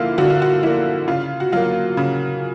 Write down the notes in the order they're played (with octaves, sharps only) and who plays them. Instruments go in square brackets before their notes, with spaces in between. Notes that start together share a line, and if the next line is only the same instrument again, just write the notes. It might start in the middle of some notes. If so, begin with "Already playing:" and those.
Already playing: [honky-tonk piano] D3 F3 A#3 E4 F4
D3 F#4
F4
F#4
F3 A#3 E4
C#3 F4
F#4
F#3 A#3 F4
C#3